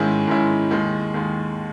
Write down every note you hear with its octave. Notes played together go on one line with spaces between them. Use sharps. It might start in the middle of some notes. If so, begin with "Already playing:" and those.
Already playing: G#2 D#3 G#3 C#4 E4
G#2 D#3 G#3 C#4 E4
D#2 D#3 G#3
D#2 D#3 G#3